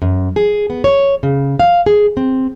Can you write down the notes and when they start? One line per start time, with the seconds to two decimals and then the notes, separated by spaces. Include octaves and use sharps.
0.02 F#2
0.36 G#4
0.70 B3
0.84 C#5
1.23 C#3
1.59 F5
1.86 G#4
2.17 C4